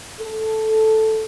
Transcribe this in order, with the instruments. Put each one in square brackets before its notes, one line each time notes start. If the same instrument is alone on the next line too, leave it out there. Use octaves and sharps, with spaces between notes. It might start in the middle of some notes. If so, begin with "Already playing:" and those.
[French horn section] A4